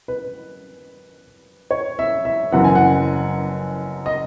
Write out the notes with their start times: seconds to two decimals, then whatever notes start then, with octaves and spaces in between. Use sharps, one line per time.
0.08 B4
1.71 C#5
1.99 E5
2.25 E5
2.52 F#1 F#2 E3 F#5
2.64 G#5
2.75 F#5
4.06 D#5